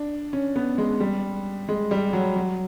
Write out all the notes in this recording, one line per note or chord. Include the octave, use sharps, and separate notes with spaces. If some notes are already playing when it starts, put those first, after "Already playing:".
Already playing: D4
C#4
B3
G#3
G3
G#3
G3
F#3
F#3